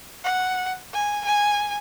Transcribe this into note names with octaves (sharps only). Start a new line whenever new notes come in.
F#5
G#5
G#5